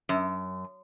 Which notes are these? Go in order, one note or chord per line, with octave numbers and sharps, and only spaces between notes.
F#2